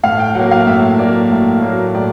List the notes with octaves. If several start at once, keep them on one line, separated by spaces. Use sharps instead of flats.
A2 F5
G5
F#3 A#3 F#5
F5
A2 E5
F#3 A#3 D5
A2
F#3 A#3
A2 D5